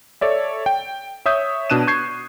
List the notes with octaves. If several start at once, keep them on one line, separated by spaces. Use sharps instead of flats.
A4 C#5 D5 E5
G5
C#5 E5 D#6 G6
B2 D4 F#6 D#7 E7
C#6 G6 G#6 C7